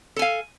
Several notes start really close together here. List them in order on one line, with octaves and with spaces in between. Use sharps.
A4 G#5 F5